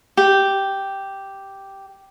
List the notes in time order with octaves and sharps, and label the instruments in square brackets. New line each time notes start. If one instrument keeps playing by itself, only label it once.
[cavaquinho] G4